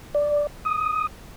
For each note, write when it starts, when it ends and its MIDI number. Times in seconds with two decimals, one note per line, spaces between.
0.15 0.47 74
0.65 1.07 87